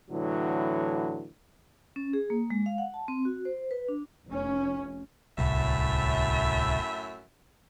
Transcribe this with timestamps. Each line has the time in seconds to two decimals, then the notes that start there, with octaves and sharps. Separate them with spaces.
0.10 A2 D3 E3 F#3
1.96 C#4
2.13 G#4
2.30 A#3
2.50 G#3
2.66 F5
2.78 F#5
2.94 A5
3.08 C4
3.25 F#4
3.45 C5
3.71 B4
3.89 D4
4.27 F1 C#4
5.38 D1 C2 F#2 A2 E5